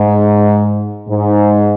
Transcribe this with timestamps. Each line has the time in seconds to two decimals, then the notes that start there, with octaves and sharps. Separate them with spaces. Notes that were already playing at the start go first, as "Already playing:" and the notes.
Already playing: G#2
1.09 G#2